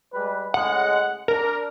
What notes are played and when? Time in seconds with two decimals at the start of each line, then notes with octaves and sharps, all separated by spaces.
0.13 G3 G#3 B4
0.54 A2 C#3 G#3 F#5
1.28 D4 A#4